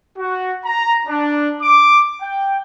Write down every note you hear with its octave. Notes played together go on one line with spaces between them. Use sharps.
F#4
A#5
D4
D6
G5